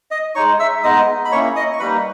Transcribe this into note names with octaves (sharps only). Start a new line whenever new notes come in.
D#5 D#6
G#3 D#4 C#5 C#6
E5 E6
G#3 B3 D#4 D#5 D#6
B5
A#3 C#4 E4 C#5 C#6
D#5 D#6
C#6
G3 A#3 D#4 B4 B5